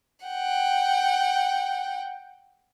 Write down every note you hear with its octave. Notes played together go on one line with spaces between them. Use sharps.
F#5 G5